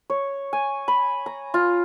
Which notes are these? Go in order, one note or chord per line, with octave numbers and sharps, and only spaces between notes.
C#5
G#5
B5
A#5
F4